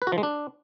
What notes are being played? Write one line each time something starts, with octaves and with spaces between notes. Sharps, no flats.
B4
F#4
F3
G#3
D4